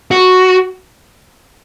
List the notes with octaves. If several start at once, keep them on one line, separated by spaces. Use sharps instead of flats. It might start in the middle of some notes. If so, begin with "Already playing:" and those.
F#4